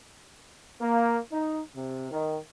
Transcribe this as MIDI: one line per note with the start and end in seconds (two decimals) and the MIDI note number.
0.82 1.17 58
1.32 1.61 63
1.76 2.10 48
2.11 2.37 51